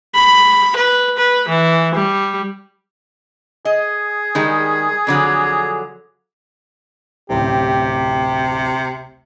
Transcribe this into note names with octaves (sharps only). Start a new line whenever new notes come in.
B5
B4
B4
E3
G3
G#4 D#5
D#3 G3 G#3
F2 D3 F#3
D1 A1 C3 G4